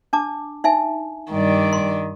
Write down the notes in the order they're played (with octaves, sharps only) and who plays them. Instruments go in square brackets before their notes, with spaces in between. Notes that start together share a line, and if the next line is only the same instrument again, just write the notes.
[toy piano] D4 A5 D6
D#4 E5 G#5
[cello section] G2 D5 [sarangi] D#3
[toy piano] C6